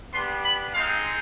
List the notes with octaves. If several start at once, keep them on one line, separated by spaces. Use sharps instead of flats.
B3 D4 G4 C6
B5
G#3 C4 D#4 F5